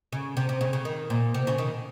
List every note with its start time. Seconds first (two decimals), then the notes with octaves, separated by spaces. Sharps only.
0.12 C#3
0.37 C3
0.49 C3
0.61 C#3
0.73 C#3
0.85 D#3
1.10 A#2
1.34 C3
1.47 C#3
1.58 D#3